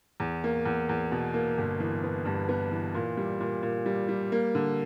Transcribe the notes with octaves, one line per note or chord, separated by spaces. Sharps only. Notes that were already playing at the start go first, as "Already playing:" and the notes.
E2
A#3
E2
E2
B2
A#3
G1
E3
B3
G2
B3
E3
A#2
G3
A#2
A#2
G3
G3
A#3
D3